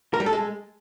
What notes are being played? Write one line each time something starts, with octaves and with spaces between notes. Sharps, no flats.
A#4
G3
A4
G#3